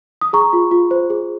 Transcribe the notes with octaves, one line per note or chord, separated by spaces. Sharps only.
D#6
G#4 A#5 C#6
F4
F4
C5
G#4